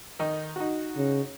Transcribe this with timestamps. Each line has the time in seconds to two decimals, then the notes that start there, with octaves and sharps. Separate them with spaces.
0.19 D#3 D#4
0.56 D#4 F#4
0.97 C#3